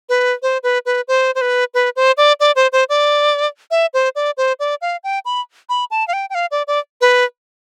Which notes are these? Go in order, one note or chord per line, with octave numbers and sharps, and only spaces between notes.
B4
C5
B4
B4
C5
C5
B4
B4
C5
D5
D5
C5
C5
D5
E5
C5
D5
C5
D5
F5
G5
B5
B5
A5
F5
G5
G5
F5
D5
D5
B4